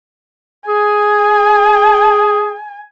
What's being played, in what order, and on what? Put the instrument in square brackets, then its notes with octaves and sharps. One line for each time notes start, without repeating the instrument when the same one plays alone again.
[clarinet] G#4 [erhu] G#5